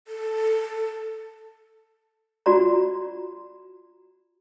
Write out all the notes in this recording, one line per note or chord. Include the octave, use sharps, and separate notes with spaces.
A4
F4 F#4 D5 A#5